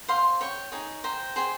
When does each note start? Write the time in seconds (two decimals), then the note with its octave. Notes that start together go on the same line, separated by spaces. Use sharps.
0.08 C5 F5 C6
0.41 C#5 G5 C#6
0.72 D#4 G#4 C#5
1.04 C5 G5 A#5
1.36 G#4 C5 G5